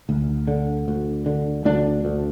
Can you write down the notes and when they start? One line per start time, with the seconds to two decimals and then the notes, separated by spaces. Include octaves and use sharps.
0.09 D2
0.48 D3
0.88 D2
1.26 D3
1.65 D2 D4
2.05 D2